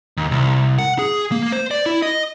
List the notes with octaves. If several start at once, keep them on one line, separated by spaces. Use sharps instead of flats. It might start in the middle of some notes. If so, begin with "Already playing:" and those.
D#2
C2
F#5
G#4
A#3
C5
D5
E4
D#5